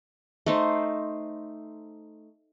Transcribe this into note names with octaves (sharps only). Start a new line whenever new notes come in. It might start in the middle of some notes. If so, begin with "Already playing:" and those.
A3 D#4 C5